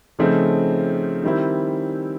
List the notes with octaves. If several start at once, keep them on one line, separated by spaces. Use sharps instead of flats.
C#3 F3 A3 C4 D#4
D#3 G3 C4 E4